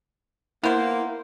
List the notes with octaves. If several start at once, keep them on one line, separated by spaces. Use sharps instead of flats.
A#3 B3 E4 C5